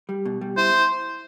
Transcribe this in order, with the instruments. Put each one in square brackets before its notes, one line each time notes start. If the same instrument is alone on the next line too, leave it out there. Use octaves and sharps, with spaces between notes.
[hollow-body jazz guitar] G3
B2
G3
[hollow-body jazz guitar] E4 [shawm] C5